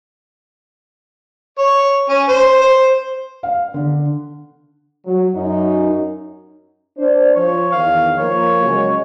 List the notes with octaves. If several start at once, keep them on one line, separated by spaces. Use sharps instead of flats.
C#5
C#4
C5
C5
F5
D3
F#3
F#2 D#4
D4 C5
F3 C#5
E2 D#3 F5
F3 A#3 C#5
C#3 F#3 G#3